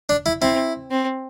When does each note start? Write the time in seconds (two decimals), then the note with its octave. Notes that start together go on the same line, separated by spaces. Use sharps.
0.09 D4
0.26 E4
0.41 C4 E4
0.91 C4